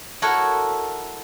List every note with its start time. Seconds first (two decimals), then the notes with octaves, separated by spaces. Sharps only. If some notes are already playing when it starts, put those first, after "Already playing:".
0.22 E4 F#4 A4 A#4 C#5 F#5